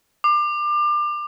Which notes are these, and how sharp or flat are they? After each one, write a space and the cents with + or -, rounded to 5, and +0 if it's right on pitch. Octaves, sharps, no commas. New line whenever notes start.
D6 +30